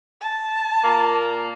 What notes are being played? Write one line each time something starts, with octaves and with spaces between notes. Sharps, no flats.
A5
A#2 A#3